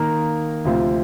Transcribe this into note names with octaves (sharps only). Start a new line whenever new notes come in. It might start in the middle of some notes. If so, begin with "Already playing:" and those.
Already playing: D#3 A#3 D#4 A#4
D2 C3 F3 C4 F4